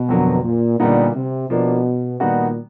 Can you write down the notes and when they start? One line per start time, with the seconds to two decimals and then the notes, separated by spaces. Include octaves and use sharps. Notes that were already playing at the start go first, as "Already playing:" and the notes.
Already playing: B2
0.09 F2 D3 F#3 A#3
0.43 A#2
0.79 A#2 D3 G3 B3 D#4
1.15 C3
1.50 B2 F3 A#3 D4
2.20 A#2 D#3 G3 B3 D#4 F#4